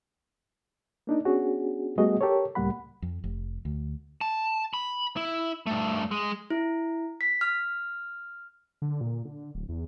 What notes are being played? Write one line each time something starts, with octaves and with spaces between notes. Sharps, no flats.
A#3 D4 D#4
B3 C#4 D4 F#4 G#4
G3 A3 B3 F#4 G#4 D#5
G4 A4 A#4 C#5
C#2 A2 G3 A#3 F#5 B5
F2
F1
D2
A5
B5
E4
G2 A3
G#3
E4
B6
F6
D3
A#2
D3
D1
E2